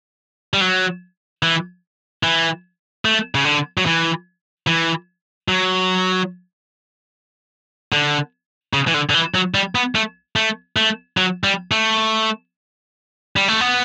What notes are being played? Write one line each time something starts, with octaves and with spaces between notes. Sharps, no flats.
G3
F#3
E3
E3
A3
C#3
D3
F#3
E3
E3
F#3
D3
C#3
E3
D3
D3
E3
F#3
G3
B3
A3
A3
A3
F#3
G3
A3
G3
A3
B3